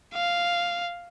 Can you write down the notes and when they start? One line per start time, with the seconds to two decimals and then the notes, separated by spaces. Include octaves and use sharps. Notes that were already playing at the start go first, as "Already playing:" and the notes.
0.14 F5